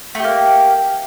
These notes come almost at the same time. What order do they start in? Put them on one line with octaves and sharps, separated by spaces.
A3 G4 A#3